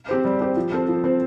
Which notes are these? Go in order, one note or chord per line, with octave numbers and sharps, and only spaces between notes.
C4 G4 C5
G3
C4 G4 C5
F3
C4 A4 C5
F3
C4 A4 C5